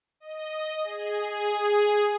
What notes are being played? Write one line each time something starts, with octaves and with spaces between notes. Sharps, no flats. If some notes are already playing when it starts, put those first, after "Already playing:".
D#5
G#4